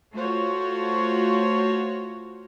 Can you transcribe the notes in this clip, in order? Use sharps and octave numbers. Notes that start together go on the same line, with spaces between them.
A3 F4 F#4 C5 C#5